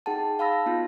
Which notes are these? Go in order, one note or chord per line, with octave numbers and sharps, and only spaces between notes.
D#4 G#4 F#5 G5 A5
F5 A5 B5 E6 A#6
B3 D#4 F4 F#4